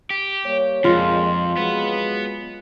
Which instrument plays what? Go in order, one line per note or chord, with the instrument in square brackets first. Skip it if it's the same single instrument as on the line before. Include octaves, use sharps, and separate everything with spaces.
[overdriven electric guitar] G4
[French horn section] G3 A#3 C#5
[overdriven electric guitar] F2 [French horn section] A#2 G#3 [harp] F4
[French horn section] F#3 G#3 [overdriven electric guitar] B3 B4